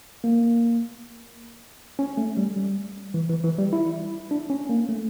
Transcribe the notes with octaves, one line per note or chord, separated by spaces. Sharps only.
A#3
C#4
A3
G3
G3
E3
E3
E3
G3
E4
D4
C#4
A#3
A3